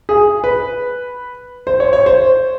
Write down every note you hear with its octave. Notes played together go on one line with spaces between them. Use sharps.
G#4
B4
C5
C#5
C#5
C5